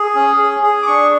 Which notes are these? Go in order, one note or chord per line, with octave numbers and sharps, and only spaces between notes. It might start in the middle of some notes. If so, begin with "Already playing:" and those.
Already playing: G#4
C#4
G#4
G#4
D6
D4 C#6